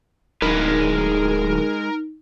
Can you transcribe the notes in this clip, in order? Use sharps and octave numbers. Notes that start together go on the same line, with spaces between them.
D1 G#3 D#4 A#4 B4